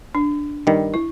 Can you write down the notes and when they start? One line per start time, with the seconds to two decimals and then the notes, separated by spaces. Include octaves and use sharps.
0.15 D4
0.67 G2 D#3 G3
0.94 E4